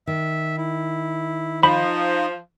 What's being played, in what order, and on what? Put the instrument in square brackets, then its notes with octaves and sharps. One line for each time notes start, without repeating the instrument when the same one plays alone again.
[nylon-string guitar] D#3 [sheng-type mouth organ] E5
[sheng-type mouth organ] E4
[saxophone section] F3 [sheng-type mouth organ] D#4 D#5 [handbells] B5